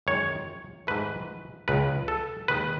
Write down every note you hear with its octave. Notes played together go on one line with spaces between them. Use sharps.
F#2 D#3 G#3 C#5
G#2 D#3 A3 B4
C#2 C#3 G#3 B4
A4
D#2 D#3 G#3 B4